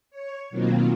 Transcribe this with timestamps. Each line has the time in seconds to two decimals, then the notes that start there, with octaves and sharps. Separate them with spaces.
0.11 C#5
0.50 B2 D#3 F#3 A#3 C4 F4